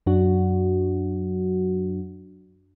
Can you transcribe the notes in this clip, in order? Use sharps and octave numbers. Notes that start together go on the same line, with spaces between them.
F#2 F#3 D4 F#4